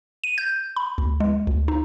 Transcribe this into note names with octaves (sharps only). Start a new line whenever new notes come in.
D#7
G6
B5
D2
G#3
D2
D#4